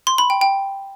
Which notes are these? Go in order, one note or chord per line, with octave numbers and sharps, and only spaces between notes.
C6
B5
G5
G5